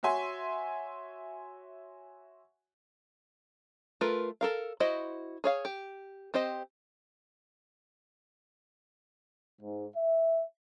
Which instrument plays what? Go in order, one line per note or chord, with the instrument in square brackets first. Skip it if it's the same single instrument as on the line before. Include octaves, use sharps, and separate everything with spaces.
[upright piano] F#4 C#5 E5 G#5 C6
[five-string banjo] A3 F4 A#4 B4
A4 A#4 F5
E4 F#4 C5 D#5
G#4 C#5 F5
G4
C4 G4 C5 D#5
[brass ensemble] G#2
E5